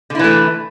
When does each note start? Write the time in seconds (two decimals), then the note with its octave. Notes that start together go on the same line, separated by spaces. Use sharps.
0.10 D3
0.15 E4
0.19 E3
0.24 A3